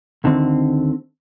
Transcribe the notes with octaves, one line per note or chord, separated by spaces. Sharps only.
D2 D3 D#3 C4